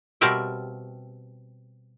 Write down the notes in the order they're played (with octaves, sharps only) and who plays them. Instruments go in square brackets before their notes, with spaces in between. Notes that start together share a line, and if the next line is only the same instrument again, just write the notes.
[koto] B2 G3 C4 A#4 E5 G5